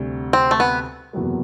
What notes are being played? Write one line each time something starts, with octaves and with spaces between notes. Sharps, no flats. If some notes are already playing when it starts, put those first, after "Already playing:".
Already playing: D2 C3 G3
C4
A3
B3
F#1 E2 C3 F#3 B3